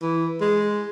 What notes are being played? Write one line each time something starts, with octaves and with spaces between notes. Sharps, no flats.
E3
G#3